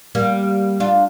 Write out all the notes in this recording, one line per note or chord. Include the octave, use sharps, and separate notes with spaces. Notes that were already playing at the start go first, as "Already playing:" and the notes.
G3 A#3
D4 F4